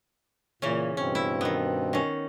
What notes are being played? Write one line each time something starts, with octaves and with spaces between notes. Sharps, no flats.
A#2 C#3 E3 C#4
G2 B2 C4 C#4
E4
D#3 B3
D#3 C#4